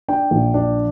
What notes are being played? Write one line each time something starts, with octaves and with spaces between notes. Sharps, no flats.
D4 G5
A#1
D4